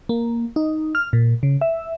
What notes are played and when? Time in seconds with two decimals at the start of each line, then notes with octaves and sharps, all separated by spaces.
0.09 A#3
0.56 D#4
0.95 F6
1.13 A#2
1.43 C#3
1.61 E5